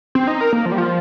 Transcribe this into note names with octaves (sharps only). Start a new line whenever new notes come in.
C4
D#4
A#4
A#3
F3
G3
F3